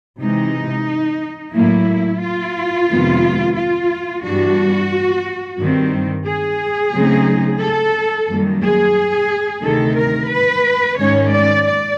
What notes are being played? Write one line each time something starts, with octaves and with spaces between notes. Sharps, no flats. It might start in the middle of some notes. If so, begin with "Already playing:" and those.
C3 E3 G#3 D#4
A2 F#3 A#3 E4
F4
F2 C3 D#3 G#3 B3
F4
G2 E3 G3 B3 D4 F#4
G2 D#3 G3 C4
G#4
C#3 F#3 A3 C4 D#4
A4
F#2 D#3 G3 A#3
G#4
D2 C3 D#3 A4
A#4
B4
G#2 D#3 G#3 C#4 C#5
D5
D5